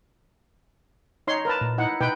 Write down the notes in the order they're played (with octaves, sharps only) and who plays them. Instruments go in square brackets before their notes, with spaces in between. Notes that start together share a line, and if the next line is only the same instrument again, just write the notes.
[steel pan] D#4 C#5 C6
A#4 B4 A5
[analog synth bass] A#2
[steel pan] D#4 E4 F#5
[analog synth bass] B2 [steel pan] D#4 B4 G5